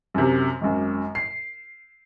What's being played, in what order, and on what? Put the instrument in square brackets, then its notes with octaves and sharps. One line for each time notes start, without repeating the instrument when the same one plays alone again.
[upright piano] F#2 C3
G#1 F#2
C7